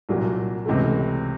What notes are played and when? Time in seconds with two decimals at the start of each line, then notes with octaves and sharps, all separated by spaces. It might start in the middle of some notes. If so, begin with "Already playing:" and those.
0.09 C2 A#2 F#3
0.66 C#2 C3 E3 A3